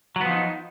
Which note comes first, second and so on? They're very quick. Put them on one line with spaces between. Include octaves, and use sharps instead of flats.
F#3 B3 F3 D#4